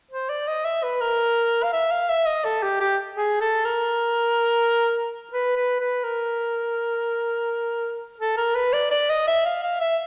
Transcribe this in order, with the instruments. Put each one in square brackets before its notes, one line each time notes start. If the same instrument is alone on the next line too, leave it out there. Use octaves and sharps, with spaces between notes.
[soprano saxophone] C5
D5
D#5
E5
B4
A#4
F5
E5
F5
E5
D#5
A4
G4
G4
G#4
A4
A#4
B4
B4
B4
A#4
A4
A#4
B4
D5
D5
D#5
E5
F5
F5
E5